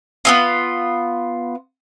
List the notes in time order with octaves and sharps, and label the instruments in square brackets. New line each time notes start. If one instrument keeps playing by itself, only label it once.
[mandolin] B3 C4 F4